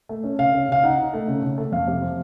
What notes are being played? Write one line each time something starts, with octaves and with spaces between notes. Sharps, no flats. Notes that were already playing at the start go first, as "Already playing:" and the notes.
A3
C#4
C#3 F5
C#4
C#3 F5
D#4 F#5
D#4
A3
C#3
C#3
A3
F2 F5
C3
F3